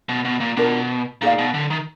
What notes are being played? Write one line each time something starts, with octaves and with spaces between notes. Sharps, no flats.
B2
B2
A#2
B2 D4 F4 A#4
A#2 D#4 G#4 D5 F5
B2
D3
D#3